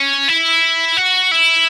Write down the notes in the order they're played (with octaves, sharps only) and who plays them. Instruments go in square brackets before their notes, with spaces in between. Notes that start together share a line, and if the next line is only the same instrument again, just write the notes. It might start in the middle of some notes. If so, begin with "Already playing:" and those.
Already playing: [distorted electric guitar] C#4
E4
F#4
E4